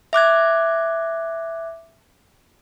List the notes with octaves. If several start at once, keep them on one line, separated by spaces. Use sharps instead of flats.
E5 D6 F#6 G#6